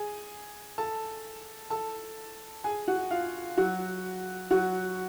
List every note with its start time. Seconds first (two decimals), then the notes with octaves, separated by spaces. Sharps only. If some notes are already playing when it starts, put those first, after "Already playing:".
Already playing: G#4 G#5
0.78 A4 A5
1.70 A4 A5
2.64 G#4 G#5
2.88 F#4 F#5
3.11 F4 F5
3.57 F#3 F#4
4.51 F#3 F#4